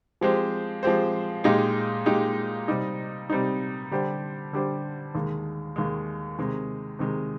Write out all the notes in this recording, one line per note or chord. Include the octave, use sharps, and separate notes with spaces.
F3 G#3 C4 G4 C5
F3 G#3 C4 G4 C5
A#2 G#3 D#4 G4
A#2 G#3 D#4 G4
C3 G3 C4 D#4
C3 G3 C4 D#4
D3 G3 D4 G4 C5
D3 G3 D4 G4 C5
D#2 D#3 G#3
D#2 D#3 G#3
C3 D#3 G#3
C3 D#3 G#3